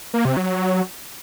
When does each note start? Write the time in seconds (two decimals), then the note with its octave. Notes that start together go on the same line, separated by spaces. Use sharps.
0.14 A#3
0.25 C3
0.37 F#3